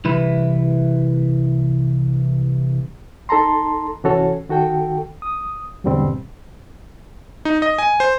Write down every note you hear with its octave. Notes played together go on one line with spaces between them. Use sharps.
C2 E3 E4 B4
D#4 A4 A5 A#5 C6
C2 E3 C#4 F#4 A4 C#5
D#3 F#4 A4 G5
D#6
E2 G#2 B2 D3 G3 C4
D#4
D#5
G#5
C5